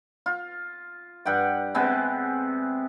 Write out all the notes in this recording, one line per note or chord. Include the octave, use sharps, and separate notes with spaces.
F4
G2 F#5 G5
C3 G#3 B3 C4